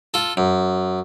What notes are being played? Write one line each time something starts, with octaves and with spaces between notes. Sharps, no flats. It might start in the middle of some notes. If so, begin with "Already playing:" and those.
F4 A4
F#2